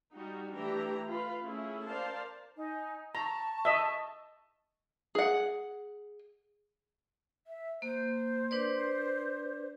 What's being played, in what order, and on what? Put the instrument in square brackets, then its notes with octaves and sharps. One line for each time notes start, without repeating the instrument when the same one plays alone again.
[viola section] G3 D#4 F#4
E3 A3 D4 G4 A#5
F4 B4 F5
A3 C#4 E4 G#4
A#4 C5 D5 F5 A5
[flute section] D#4 G#5
[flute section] A5 C#6 [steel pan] A#5
[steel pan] D#5 E5
[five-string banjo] G#4 F#5
[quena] E5
[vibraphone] A#3 [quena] C5
[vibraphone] D4 B4 D5